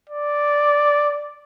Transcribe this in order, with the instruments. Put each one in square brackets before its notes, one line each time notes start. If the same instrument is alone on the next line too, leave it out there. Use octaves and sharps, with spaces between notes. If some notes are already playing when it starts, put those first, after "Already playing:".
[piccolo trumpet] D5